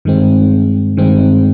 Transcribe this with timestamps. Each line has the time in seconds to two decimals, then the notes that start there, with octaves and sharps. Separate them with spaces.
0.05 G2 D#3 G#3 C4
0.97 G2 D#3 G#3 C4